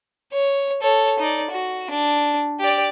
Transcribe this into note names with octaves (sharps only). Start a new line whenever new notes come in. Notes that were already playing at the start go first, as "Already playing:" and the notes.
C#5
A4 C#5
D#4 D5
F#4
D4
G4 D5